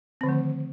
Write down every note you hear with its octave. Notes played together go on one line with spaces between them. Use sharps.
D3 D#3 F3 A3 C4